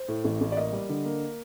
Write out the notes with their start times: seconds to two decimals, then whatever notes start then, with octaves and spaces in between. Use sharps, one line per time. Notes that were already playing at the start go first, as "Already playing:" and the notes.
Already playing: C5
0.08 A2
0.24 A1
0.41 A1
0.52 D5
0.57 A#3 D#5
0.73 G3
0.89 D3
1.05 A#3